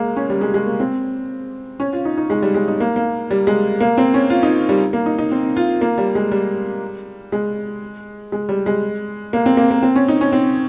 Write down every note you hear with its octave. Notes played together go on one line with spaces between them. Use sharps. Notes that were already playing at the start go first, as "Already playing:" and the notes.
Already playing: G#3 A#3
C#4
G3
G#3
G#3
A#3
C4
C#4
F4
D#4
D#4
G#3
G3
G#3
D#4
A#3
A#3
G3
G#3
A#3
C4
C#4
F4
D#4
G3
A#3
D#4
D#4
C4
F4
A#3
G3
G#3
G3
G#3
G#3
G3
G#3
A#3
C4
A#3
A#3
C4
C#4
D#4
C#4
C4